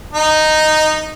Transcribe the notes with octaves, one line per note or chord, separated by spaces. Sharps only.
D#4